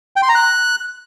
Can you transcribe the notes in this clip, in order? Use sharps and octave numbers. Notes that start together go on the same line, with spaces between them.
G5
C6
A#5
F#6